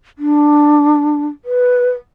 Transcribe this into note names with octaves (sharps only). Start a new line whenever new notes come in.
D4
B4